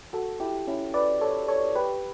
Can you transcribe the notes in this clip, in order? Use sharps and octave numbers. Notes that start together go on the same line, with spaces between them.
F#4 A4
E4 G4
C#4 E4
B4 D5
A4 C#5
A4 C#5
G4 B4